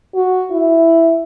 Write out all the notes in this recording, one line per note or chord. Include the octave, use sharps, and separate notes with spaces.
F#4
E4